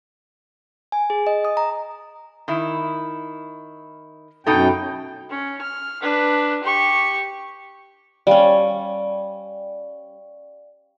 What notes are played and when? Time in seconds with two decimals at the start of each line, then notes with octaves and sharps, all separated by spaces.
0.92 G#5
1.10 G#4
1.27 D#5
1.45 D#6
1.57 A#5
2.48 D#3 E4
4.46 F#2 B2 D#4 A4 G5
5.30 C#4
5.62 F6
6.02 D4 B4
6.64 G4 C#6
8.27 G3 C#4 D5 F5 G5